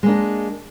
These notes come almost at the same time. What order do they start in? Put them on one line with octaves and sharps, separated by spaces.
G#3 A#3 D4